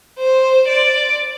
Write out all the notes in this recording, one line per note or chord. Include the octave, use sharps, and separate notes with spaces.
C5
D5